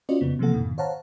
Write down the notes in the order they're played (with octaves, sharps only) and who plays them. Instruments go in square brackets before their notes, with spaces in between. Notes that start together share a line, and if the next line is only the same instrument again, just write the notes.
[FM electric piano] C#4 F4 F#4 C5 D5 D#5
F2 C#3 B3
C3 E3 F3 A#3 A4 F#5
F2 G#2 B2 D#3
C5 C#5 F5 F#5 A5 A#5